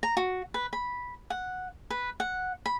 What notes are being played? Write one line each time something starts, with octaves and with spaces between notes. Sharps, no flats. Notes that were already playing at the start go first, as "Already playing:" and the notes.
A#5
F#4
B4
B5
F#5
B4
F#5
B5